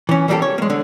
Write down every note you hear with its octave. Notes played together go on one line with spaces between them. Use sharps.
E3 C#4
E3 G3 A#3 F4 G4 A4
C#5
G#3 A#3
D3